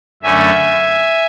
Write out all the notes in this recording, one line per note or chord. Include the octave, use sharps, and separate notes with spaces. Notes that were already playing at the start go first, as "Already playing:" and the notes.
F#2 D3 A3 C#4 E5 G#5